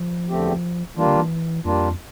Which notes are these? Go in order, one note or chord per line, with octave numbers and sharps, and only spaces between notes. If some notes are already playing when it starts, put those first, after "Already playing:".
Already playing: F3
E2 D3 A3 C4 G4
E3 G3 A#3 D4 F4
D3
E3
F2 G3 A#3 D4 F4